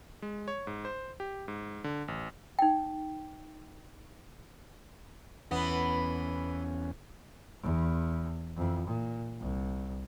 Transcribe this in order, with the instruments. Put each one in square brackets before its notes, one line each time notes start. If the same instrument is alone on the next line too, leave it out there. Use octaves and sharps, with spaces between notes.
[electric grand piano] G#3
C#5
G#2
C5
G4
G#2
D3
A1
[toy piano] D#4 G5
[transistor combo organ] E2 C#4 [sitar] E3 B3
[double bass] E2
F2 E3
A#2
C2